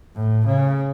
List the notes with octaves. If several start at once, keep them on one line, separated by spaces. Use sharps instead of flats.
A2
C#3